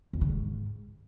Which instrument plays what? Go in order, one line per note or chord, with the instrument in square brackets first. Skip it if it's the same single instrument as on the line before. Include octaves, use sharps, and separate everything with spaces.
[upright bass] F2
D3
G#2